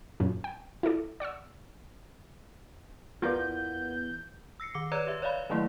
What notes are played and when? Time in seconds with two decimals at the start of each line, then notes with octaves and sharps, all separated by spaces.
0.20 F#2 A#2
0.44 G5
0.83 E4 F4 A4 D5
1.20 D5 F#5 C#6 E6
3.22 E2 A#3 B3 F4 A#4 B4 D5 G6
4.60 E6 A#6 C7 C#7
4.74 D#3 D6 C#7
4.92 B4 C#5 D5 A#5 E6 G#6
5.07 G4 E5
5.22 C#5 D5 E5 F5 B5
5.50 D#3 E3 F#3 A3 A#3 E4